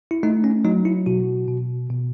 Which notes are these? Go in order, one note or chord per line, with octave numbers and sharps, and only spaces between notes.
E4
A3 D#4
C#4
F#3 D#4
E4
B2 F#4
B2
B2